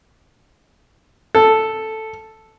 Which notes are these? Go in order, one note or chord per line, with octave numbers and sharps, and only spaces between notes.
A4